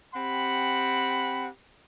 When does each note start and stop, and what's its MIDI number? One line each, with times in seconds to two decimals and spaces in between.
0.13 1.47 60
0.13 1.47 67
0.13 1.47 78
0.13 1.47 83